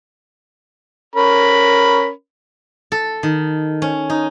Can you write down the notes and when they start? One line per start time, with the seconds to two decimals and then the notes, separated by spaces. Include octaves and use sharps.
1.16 C#4 A#4 B5
2.92 A4
3.23 D#3
3.82 C#4
4.10 D#4